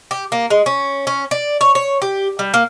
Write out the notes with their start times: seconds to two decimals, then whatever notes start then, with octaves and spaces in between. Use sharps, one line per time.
0.11 G4
0.32 A#3
0.50 G#3
0.66 C#4
1.07 C#4
1.31 D5
1.61 C#5
1.75 C#5
2.02 G4
2.39 G3
2.54 A#3